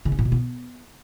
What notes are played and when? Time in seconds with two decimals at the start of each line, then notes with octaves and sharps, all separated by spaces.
0.05 C#3
0.12 C#4
0.19 A2
0.25 B2
0.32 B3